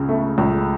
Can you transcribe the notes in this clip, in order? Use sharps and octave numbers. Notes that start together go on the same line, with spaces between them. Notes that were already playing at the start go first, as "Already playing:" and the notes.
Already playing: C#2 C#3
A3
C#2